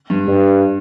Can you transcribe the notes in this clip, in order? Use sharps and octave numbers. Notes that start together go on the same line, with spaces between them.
G2
G2